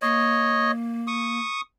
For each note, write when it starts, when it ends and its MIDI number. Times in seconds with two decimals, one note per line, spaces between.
0.02 1.39 58
0.02 0.72 73
0.02 0.72 75
1.07 1.61 85
1.07 1.61 87